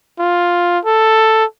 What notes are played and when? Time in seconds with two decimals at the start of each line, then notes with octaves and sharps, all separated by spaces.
0.19 F4
0.85 A4